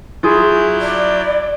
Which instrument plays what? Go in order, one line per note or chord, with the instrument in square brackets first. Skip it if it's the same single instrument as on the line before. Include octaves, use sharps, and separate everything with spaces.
[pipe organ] F#3 E4 G6 [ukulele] F4 G#4
[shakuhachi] D5